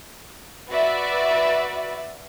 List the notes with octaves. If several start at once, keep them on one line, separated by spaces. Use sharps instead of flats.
F#4 B4 D5 E5